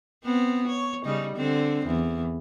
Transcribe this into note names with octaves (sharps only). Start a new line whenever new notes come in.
B3 C4
C#5
C#3 G3 D#4
D3 C4
E2